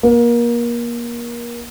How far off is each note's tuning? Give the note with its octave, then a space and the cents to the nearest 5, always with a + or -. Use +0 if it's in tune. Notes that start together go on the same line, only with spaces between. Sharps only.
A#3 +30